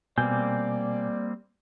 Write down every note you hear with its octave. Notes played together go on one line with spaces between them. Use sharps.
B2 G3 A#3 C4 D5 G#5 G6